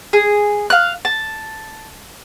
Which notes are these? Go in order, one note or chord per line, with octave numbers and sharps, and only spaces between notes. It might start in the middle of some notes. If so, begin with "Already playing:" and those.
G#4
F5 F#6
A5